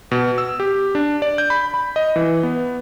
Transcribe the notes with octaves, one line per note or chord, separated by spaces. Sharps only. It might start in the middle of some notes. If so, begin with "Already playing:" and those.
B2
E6
G4
D4
D5
G6
B5
B5
D#5
E3
B3